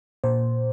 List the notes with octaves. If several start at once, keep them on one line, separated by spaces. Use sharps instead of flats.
A#2 C5